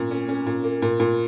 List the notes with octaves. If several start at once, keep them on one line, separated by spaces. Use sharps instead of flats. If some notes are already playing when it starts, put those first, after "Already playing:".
Already playing: A#2 C#4
C#4
C#4
A#2
A#3
A#2
A#2